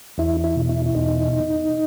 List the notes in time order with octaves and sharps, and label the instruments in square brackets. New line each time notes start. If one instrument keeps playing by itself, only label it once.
[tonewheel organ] E2 E4
E4
B2
E4
E4
E2 D#4